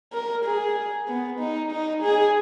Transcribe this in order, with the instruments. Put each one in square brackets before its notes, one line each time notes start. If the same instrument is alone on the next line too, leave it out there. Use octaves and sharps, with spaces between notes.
[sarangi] A#4
G#4
B3
D#4
D#4
G#4